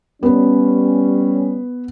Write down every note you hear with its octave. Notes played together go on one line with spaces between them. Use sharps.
G3 B3 C#4 B4